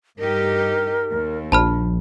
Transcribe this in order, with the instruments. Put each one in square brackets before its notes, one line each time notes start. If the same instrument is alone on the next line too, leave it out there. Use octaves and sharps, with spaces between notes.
[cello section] G2 D#4 G4 [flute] A#4
[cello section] D#2
[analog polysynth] A#1 [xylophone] A5 B5 F6